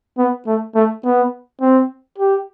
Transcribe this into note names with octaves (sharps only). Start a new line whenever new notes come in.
B3
A3
A3
B3
C4
G4